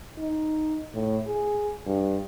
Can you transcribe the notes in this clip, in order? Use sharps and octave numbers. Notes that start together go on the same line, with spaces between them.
D#4
A2
G#4
G2